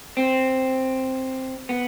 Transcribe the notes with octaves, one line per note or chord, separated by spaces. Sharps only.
C4
B3